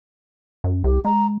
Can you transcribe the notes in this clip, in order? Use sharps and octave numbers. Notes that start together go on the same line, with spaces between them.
F#2
C2 G4
G#3 A#5